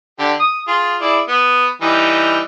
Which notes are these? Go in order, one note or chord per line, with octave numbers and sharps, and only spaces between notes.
D3 G4
D#6
F4 G#4
E4 G#4 D5
B3
E3 G3 D#4